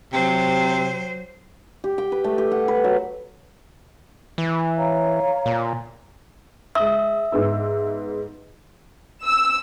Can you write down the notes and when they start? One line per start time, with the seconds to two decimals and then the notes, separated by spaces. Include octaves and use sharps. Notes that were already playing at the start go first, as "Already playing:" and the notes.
0.13 C3 F#3 C5
1.84 G4
1.98 G5
2.12 B4
2.24 A3
2.38 G4
2.51 F#5
2.68 B4
2.84 F#3
4.38 E3
4.77 C#5 F5 A#5
5.46 A#2
6.75 G#3 E5 D#6
7.32 G#2 B3 E6
9.24 E6